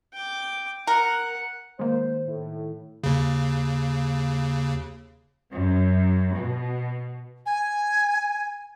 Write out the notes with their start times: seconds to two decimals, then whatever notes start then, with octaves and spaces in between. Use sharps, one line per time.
0.13 G5 D6
0.87 A#4 F#5
1.79 D#3 G#3 A#3 C5
2.26 A2
3.04 D#2 C#3
5.53 F#2
6.36 B2
7.45 G#5